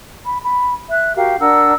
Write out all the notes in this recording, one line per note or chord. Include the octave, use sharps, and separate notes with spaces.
B5
B5
E5 F#6
F#4 G4 A#4 F5
D4 A#4 F#5 E6